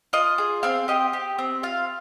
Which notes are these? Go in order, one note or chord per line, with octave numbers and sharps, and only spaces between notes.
F4 D#5
G#4
C4 F5
G4 D#5
G4
C4
F4 F5